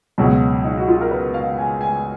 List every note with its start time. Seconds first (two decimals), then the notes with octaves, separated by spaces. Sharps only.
0.18 C#2 B2 F#3
0.64 D#4
0.77 F#4
0.88 F4
1.01 A#4
1.11 B4
1.34 F5
1.58 G#5
1.81 G#5